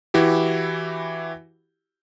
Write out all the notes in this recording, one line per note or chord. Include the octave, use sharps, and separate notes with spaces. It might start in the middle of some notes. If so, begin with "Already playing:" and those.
E3 E4 F#4 G4